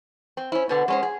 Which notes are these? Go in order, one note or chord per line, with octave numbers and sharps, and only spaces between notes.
C4
C#4 E4 C5
B2 D3 B3 B4
G#3 C#4 C5 F#5
G#4